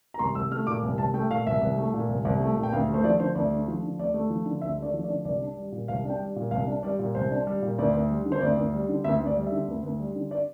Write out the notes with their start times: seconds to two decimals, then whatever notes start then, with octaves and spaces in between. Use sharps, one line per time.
0.14 A#5
0.19 C2 C6
0.35 C2 E6
0.52 A3 F6
0.67 A#2 D6
0.83 C2
0.98 C2 A5
1.14 A3 G5
1.30 A#2 F5
1.47 C2 E5
1.61 C2
1.77 A3
1.94 A#2
2.09 C2
2.25 C2
2.40 A3
2.57 A#2
2.63 G5
2.73 D2 F5
2.88 A3
2.94 C5
3.04 F3 D5
3.19 D3 C5
3.35 D2 D5
3.51 A3
3.68 F3
3.83 D3
3.98 D2 D5
4.14 A3
4.30 F3
4.46 D3
4.62 D2 E5
4.78 A3 D5
4.94 F3
5.04 D5
5.09 D3
5.25 C2 D5
5.41 D4
5.57 G3
5.72 A#2
5.88 C2 F5
6.05 D4 G5
6.20 G3
6.36 A#2
6.51 C2 F5
6.67 D4
6.83 G3 D5
6.99 A#2
7.15 C2 C5
7.31 D4
7.47 G3
7.62 A#2
7.78 D2 D5
7.93 D2
8.10 G3
8.26 D3
8.32 C5
8.41 D2 D5
8.57 D2
8.74 G3
8.89 D3
9.04 D2 E5
9.20 D2
9.26 D5
9.36 G3
9.46 E5
9.52 D3
9.67 D2
9.83 D2
9.99 G3
10.15 D3
10.31 D5